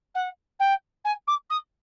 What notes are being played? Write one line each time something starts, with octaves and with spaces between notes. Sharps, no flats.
F#5
G5
G#5
D6
D#6